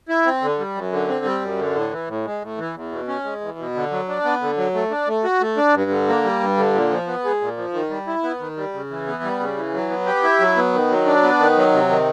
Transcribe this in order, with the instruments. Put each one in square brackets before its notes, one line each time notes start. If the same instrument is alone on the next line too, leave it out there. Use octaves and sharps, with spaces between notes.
[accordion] E4
C4
D3
G3
F#2
D3
C4
G3
F#2
D3
A2
E3
A2
G#3
A2
E3
E2
B2
C#4
G#3
E2
B2
D3
F#3
D4
B3
D3
F#3
A3
D4
A3
F#4
A3
D4
G2
D3
A#3
G3
G2
D3
A#2
F3
B3
G#3
A#2
F3
D#3
G3
E4
B3
D#3
G3
C#3
E3
B3
G3
C#3
E3
F#3
B3
G4
E4
F#3
B3
D#3
F#3
D4
B3
D#3
F#3
C3
D#3